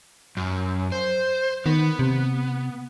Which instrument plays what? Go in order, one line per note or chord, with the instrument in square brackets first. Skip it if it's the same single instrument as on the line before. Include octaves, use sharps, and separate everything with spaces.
[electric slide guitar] F#2
C5
[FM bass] D#3 [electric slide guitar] B3
[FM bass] C3